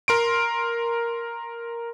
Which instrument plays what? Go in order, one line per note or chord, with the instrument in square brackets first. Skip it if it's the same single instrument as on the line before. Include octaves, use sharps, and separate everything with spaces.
[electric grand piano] A#4 C6 D7